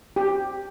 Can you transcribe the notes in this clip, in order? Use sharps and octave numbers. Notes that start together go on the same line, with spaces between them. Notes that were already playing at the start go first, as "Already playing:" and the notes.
G4